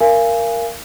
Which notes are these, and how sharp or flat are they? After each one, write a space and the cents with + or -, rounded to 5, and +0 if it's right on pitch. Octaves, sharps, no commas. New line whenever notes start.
A#4 +0 F5 -30 G#5 +0